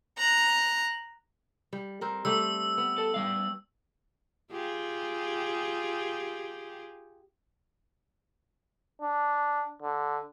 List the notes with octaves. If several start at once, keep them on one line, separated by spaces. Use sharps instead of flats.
A#5 F#6
G3
G3 C4 A#4
G3 A3 G4 E6
B3
A4
G3 F5
F4 G4 G#4
D4
D3